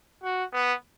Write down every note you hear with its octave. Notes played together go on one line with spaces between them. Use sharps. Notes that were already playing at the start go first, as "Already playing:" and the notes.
F#4
B3